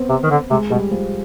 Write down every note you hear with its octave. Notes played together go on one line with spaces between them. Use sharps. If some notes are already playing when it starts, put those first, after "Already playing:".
Already playing: B3 C4
C3
D#3
D3
C3 G#3
B2 G3
F3